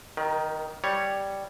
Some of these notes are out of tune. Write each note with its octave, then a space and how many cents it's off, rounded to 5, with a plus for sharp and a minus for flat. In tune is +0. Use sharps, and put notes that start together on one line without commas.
D#3 +0 G3 -40 A#4 +40
G3 +0 C#5 +0